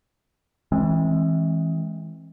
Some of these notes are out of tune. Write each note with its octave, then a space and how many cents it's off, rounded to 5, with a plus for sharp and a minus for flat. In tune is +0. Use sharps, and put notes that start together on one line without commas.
E3 -25 G#3 +5 C4 +35